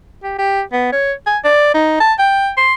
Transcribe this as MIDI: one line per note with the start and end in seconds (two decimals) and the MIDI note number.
0.23 0.37 67
0.38 0.62 67
0.73 0.91 59
0.92 1.13 73
1.26 1.38 80
1.44 1.74 74
1.74 1.97 63
2.00 2.13 81
2.19 2.50 79
2.57 2.74 84